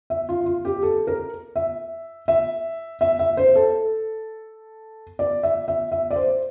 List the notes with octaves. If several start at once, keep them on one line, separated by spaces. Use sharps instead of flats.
E5
F4
F4
G4
A4
A#4
E5
E5
E5
E5
C5
A4
D5
E5
E5
E5
D5
C5